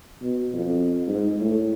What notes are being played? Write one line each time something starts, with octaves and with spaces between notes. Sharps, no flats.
B2
F2
G#2
A2